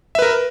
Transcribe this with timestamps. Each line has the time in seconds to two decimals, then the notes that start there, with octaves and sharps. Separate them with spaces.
0.15 E5
0.19 B4
0.22 A#4